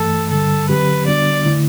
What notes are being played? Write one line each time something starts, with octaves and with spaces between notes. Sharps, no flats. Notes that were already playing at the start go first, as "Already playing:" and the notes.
Already playing: G2 E3 A3 A4
G2 D3 G3 A4
D3 F#3 C4 G4 B4
D3 G3 B3 D4 F#4 D5
D3 A3 E4